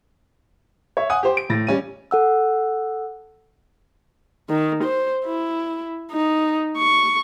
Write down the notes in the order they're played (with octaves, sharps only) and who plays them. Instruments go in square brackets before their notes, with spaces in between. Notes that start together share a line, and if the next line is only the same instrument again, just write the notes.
[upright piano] C#5 E5
F#5 G#5 D#6
G4 C5
D7
A2 A6 A#6
G3 C#4 D#7
[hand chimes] A4 F#5 E6
[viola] D#3
C5
E4
D#4
C#6